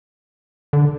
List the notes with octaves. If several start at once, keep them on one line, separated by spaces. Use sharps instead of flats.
D3